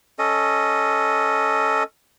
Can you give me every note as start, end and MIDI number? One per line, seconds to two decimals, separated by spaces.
0.19 1.83 61
0.19 1.83 69
0.19 1.83 75